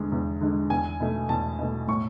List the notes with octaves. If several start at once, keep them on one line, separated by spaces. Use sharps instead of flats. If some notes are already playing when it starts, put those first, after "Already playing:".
Already playing: E2 D3 G#3
E2
D3 G#3
E2 G#5
B2 A3
E2 A5
B2 A3
A2 C#6